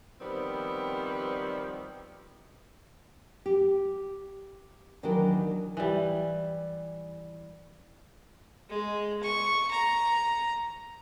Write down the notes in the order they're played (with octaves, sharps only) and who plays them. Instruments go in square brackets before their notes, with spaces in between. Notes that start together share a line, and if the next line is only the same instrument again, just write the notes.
[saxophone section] D#3 F3 G3 B3 C4
[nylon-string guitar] G4
D#2 D#3 E3 F#3 D4 A#4
[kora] E3 G3
[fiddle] G#3
C#6
A#5